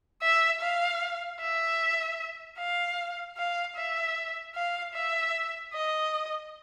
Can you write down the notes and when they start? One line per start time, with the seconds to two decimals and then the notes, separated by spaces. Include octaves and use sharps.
0.22 E5
0.61 F5
1.40 E5
2.58 F5
3.37 F5
3.76 E5
4.55 F5
4.95 E5
5.73 D#5